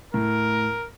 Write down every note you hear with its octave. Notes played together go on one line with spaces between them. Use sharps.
A2 A#4